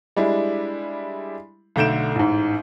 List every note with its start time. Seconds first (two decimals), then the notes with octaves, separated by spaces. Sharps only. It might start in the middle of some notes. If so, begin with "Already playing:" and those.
0.16 G3 G#3 D4 E4
1.76 B1 D3 A3 G6 D7 E7
2.15 A1 G#2